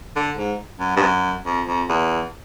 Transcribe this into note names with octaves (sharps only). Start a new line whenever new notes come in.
D3
G#2
F#2
G2
F#2
F2
F2
E2